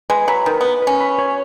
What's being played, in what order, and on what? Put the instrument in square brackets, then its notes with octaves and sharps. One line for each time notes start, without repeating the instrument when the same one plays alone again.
[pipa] G#3 [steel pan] B4
[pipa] F#3 [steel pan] B5
[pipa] D#3 [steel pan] B4
[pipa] B3 [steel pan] B4
[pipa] C#4 [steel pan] B4
[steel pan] B5
C#5